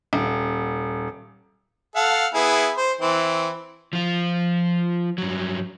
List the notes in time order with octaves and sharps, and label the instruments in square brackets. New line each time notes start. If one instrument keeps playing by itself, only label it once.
[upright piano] D#1
[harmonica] A4 F5 F#5
B3 E4 G#4
C5
E3 C4
[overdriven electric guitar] F3 F4
G2 F#3